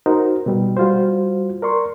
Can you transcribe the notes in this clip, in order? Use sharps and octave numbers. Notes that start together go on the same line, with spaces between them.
D#4 F#4 A#4 C5
B2 G3 G4
G3 F4 F#4 C5
A#4 D5 C6 C#6